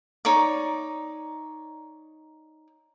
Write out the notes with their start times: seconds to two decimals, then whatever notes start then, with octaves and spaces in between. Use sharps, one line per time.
0.25 D#4 C#5 D5 D6